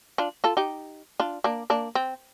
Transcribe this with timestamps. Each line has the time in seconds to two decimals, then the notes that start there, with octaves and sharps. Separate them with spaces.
0.18 D4 F4
0.44 F4 A4
0.57 D#4 G4
1.20 D4 F4
1.44 A#3 D4
1.70 A#3 D4
1.95 C4